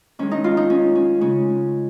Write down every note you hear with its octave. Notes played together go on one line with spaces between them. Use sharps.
D#3 G#3 C#4
D#4
F4
D#4
C#4
C#4
C#3 G#3 C#4